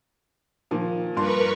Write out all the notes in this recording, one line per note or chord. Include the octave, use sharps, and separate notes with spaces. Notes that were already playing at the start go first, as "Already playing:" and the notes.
A#2 D#3 F3
G2 A#4 B4 C6 C#6